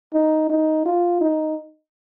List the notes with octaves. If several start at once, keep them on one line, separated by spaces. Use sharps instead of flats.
D#4
D#4
F4
D#4